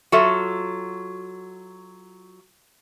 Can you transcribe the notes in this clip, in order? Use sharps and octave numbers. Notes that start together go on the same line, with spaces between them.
F#3 F4 F#4 A4 E5